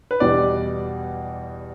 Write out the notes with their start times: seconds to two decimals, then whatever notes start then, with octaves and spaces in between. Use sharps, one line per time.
0.11 B4
0.20 E2 B2 G3 D5